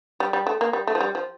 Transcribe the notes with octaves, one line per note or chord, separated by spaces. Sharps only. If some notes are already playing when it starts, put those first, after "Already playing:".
G3
G3
A3
A#3
G3
A3
F3
G3
F3